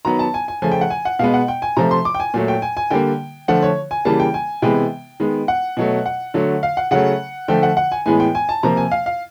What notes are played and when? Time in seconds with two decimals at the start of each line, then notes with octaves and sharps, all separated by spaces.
0.05 D#3 F#3 B3 A#5
0.19 A5
0.34 G#5
0.48 G#5
0.62 C#3 F3 A3 G#5
0.71 G5
0.81 F#5
0.90 G#5
1.05 F#5
1.19 B2 G#3 B3 F5
1.34 F#5
1.48 G5
1.62 G#5
1.77 C3 F3 A3 A#5
1.91 C6
2.05 D6
2.15 G5
2.20 G#5
2.34 A#2 F#3 A3
2.48 G5
2.62 G#5
2.77 G#5
2.90 D3 G3 A#3 G5
3.48 D3 F3 A3 F#5
3.62 C#5
3.91 G#5
4.05 C#3 E3 G3 A#3 A5
4.20 G5
4.34 G#5
4.62 C3 E3 G#3 B3 G5
5.20 D#3 G#3 B3
5.48 F#5
5.77 B2 F#3 A3
6.06 F#5
6.34 D3 F#3 A3
6.63 F5
6.77 F#5
6.91 C#3 F#3 A3 F#5
7.48 D3 F3 A3 G5
7.63 F#5
7.77 F#5
7.92 G#5
8.06 A2 E3 G#3 B3 G#5
8.20 G5
8.35 G#5
8.49 A5
8.63 C3 F3 A#3 A#5
8.77 G#5
8.92 F5
9.06 F5